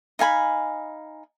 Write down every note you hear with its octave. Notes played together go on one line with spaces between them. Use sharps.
D#4 F5 G#5 B5